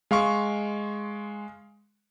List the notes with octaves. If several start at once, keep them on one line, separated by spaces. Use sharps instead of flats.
G#3 F5 C6 C#6